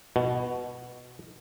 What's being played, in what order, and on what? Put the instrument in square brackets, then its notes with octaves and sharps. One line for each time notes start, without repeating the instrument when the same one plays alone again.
[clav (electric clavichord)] B2